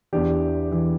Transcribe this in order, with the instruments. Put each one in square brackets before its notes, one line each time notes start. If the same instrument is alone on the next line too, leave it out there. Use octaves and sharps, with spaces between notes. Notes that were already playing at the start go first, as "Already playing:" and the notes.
[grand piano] E2 E3 D4 G4
E3